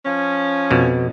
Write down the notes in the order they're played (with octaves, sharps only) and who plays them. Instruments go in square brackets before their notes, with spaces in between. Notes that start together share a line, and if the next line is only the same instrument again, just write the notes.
[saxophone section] F3 C#4
[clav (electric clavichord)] F2 B2